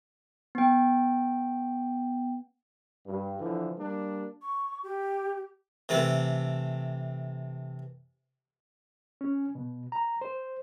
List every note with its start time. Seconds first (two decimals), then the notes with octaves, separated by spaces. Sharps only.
0.55 B3 G5
3.05 G2
3.40 D3 E3 F3
3.77 G3 A#3 D4
4.42 C#6
4.83 G4
5.89 C3 E3 A3 A4
9.21 C#4
9.55 B2
9.92 A#5
10.21 C5